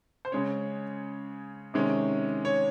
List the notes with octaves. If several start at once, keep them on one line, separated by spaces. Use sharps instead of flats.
C5
C#3 G#3 C#4 C#5
C3 D#3 G#3 C#4
C#5